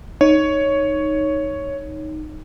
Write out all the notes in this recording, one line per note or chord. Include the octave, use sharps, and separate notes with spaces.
D#4 C#5